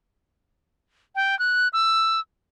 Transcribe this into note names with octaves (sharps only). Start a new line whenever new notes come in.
G5
F#6
E6